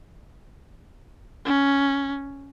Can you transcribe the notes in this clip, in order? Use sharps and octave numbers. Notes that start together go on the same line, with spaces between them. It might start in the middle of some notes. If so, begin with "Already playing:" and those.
C#4